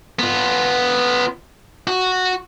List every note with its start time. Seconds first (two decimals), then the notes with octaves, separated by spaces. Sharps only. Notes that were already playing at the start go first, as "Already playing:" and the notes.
0.19 B3 F4
1.87 F#4